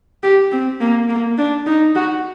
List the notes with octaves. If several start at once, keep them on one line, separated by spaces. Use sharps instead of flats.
G4
C4
A#3
A#3
D4
D#4
F#4